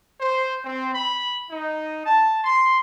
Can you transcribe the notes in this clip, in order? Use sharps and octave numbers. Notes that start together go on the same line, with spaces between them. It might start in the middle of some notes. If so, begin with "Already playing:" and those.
C5
C4
B5
D#4
A5
C6